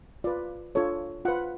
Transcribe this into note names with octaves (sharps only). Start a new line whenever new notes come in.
F4 B4 D5
D4 F4 A4 C#5
F4 B4 F#5